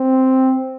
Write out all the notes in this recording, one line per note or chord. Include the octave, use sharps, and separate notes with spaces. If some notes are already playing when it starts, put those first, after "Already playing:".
Already playing: C4